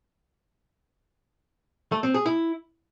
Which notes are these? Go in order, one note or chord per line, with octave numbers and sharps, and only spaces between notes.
A3
C4
G#4
E4